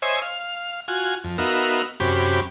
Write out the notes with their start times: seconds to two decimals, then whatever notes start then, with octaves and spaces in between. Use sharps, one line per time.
0.02 C5 C#5 D#5 E5 G#5
0.22 F5
0.88 F4 F#4 G#5
1.24 F2
1.38 B3 D#4 F#4 A#4 E5 F5
2.00 F#2 C3 C#4 G4 B5 D6